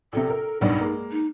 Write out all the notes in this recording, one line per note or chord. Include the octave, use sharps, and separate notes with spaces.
A#1 C3 A4
A#4
B1 G2 D4 D#4
G#3 A#3
D#4